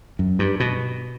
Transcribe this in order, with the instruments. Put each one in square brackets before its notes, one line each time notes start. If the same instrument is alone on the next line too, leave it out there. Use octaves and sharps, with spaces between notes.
[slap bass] F#2
G2
B2